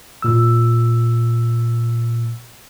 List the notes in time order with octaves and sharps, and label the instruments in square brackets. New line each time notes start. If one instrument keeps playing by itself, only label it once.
[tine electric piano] A#2 E6